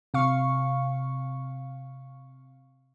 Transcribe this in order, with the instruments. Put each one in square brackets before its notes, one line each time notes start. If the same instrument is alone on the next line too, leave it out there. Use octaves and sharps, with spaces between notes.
[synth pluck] C3 F5 C#6